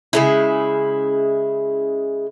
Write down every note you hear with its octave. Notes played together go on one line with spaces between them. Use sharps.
C#3 G#3 E4